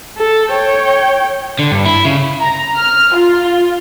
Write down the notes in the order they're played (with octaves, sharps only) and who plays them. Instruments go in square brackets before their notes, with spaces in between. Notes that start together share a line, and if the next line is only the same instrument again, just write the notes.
[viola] A4
C#5 G5
[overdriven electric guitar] D3
G2
E4
C#3
[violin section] A#5
F6
F4